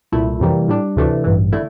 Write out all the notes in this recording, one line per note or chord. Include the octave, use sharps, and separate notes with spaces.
C2 A#2 A3 E4
F2 C3 E3 G3 A#3
A2 G3 D4
D2 C3 E3 A3 D4
A1 G2 E3
D3 A3 E4